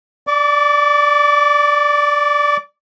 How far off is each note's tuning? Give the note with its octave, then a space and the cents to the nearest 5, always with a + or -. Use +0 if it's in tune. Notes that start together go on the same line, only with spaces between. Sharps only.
D5 +0 D6 -35